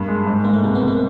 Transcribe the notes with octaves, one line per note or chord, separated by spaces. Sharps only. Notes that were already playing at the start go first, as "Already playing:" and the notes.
Already playing: G2 A#3
G#3
G#2
G#2 A#3
A3
C2 A#3
B3
C2
A#3